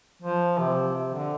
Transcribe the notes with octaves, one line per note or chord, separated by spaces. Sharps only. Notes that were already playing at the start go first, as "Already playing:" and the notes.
F3
C3
C3
D3